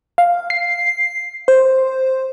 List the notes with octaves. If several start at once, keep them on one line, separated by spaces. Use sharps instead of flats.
F5
C7
C5